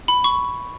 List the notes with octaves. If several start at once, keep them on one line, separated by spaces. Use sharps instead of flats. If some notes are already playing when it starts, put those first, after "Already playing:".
B5
C#6